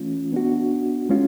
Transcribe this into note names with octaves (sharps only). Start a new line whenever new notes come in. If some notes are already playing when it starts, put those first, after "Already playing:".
Already playing: E3 A3 C#4 F4
B3 D4 F#4
G#3 C#4 F4